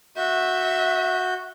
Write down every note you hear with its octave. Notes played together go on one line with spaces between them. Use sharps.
F#4 E5 G6